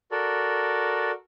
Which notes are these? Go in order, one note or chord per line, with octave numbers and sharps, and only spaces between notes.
F#4 A4 A#4 D5